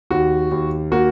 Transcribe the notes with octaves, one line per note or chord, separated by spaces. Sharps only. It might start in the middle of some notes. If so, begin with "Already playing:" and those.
D#2 F#4
D#2
A#3 F#4